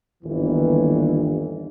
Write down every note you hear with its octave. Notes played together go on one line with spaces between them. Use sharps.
G1 D#2 D#3 E3